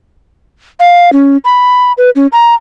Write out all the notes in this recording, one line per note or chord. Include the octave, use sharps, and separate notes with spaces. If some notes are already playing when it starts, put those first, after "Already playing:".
F5
C#4
B5
B4
C#4
A#5